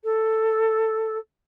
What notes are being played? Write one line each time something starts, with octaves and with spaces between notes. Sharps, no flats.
A4